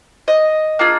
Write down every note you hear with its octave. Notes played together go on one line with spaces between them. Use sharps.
D#5
A#3 D4 F4 G#4